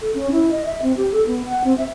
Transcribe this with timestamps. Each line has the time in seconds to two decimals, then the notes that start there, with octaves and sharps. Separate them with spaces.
0.01 A4
0.14 C#4
0.31 E4
0.51 D#5
0.65 E5
0.82 C4
0.97 G4
1.12 A4
1.27 B3
1.45 F#5
1.64 C4
1.78 E5